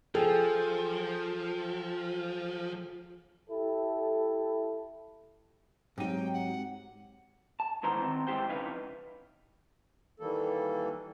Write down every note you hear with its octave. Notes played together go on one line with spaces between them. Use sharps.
F3 G#4 A4 G5
E4 G4 A4
G#2 F#3 G#3 C4 D#4 G4 G5
F#5
A5
C#2 D#3 E3 B3 C5 A#5
D#3 C4
G#2 E4 G4 C5 G5
F2 C#3 D#4 E4 B4 F5
D#3 E3 G3 A#3 A4